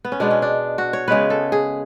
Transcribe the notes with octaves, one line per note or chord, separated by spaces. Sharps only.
B3
C#4
B2 G#3 B3 D4
C#4
D4
F#4
C#5
C#3 G#3 B3 B4
A4
G#4